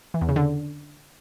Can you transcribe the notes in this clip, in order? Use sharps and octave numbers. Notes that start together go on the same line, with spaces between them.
E3
E2
C#3
D3